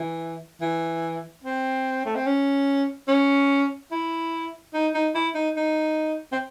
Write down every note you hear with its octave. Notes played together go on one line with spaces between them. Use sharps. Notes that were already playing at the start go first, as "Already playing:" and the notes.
Already playing: E3
E3
C4
A3
C4
C#4
C#4
E4
D#4
D#4
E4
D#4
D#4
C4